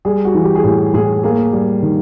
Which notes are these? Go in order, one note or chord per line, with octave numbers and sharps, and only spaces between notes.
G3 G#4
F#4
E3
G4
G#4
A2 G4
A2 G#4
A#3 G#4
G3
D#3